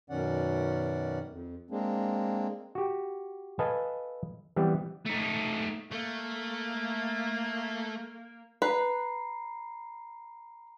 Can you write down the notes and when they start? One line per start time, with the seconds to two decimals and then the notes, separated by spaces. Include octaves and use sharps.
0.10 F#2 B2 D#3 C#4 D5 F#5
1.29 F2
1.71 G#3 A#3 C4 D4
2.75 F#4 G4
3.59 A4 B4 D#5 F5 G#5 A5
4.56 E3 G3 B3 C4
5.06 A3 D#4
5.91 A3 A#3
8.62 B4 A#5 B5 C7